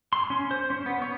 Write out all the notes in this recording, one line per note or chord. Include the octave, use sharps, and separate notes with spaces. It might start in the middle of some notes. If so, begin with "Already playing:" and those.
C6
C#4
C5
C#4
B3
C#5